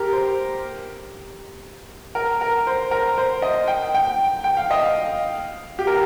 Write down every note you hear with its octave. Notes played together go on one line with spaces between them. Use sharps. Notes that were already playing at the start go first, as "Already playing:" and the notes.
Already playing: G4 A#4
C5
A#4
A#4
C5
A#4
C5
D#5
G5
G5
G5
F5
D#5
F5
G4
A#4